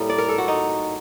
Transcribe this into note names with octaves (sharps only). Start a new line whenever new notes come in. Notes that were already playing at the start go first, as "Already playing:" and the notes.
Already playing: A2 G3 A#3
D5
A#4
A4
F#4
D#4